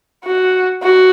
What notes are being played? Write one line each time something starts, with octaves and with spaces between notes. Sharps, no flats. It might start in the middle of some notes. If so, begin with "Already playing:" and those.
F#4
F#4